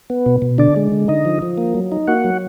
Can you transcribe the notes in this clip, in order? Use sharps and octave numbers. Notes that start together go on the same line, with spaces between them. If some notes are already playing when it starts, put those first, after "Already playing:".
B3
B2
B2
D3 D4 D5
G#3
D3
D3 D#4 D#5
F3
F3
A#3
F#3
D#4
A#3 F#4 F#5
F#3